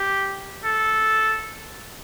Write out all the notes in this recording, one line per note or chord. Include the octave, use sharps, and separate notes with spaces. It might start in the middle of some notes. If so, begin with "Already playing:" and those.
Already playing: G4
A4